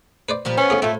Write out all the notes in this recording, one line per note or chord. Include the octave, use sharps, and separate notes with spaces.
B4 C5 D5
A#2 F3 G3
B3 C#4
A2 C#3 G#4
A2 A3 C4 F4